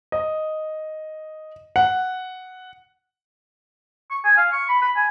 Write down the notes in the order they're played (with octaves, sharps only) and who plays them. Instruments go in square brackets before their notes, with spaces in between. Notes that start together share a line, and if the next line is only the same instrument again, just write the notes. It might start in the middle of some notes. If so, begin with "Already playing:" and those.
[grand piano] D#5
F#5
[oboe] C#6
G#5
F5
C#6
B5
B5
G#5